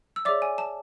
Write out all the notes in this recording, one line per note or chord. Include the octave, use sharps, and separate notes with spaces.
E6
G#4 C#5 D5 E5 D6
G#5
A5